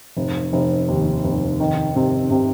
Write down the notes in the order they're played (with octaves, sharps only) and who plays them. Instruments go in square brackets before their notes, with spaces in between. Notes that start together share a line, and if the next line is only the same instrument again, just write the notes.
[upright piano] F1
F1
D#2
F1
D#3
C3
C3